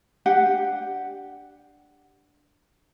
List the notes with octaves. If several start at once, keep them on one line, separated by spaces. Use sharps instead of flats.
D4 G4 F#5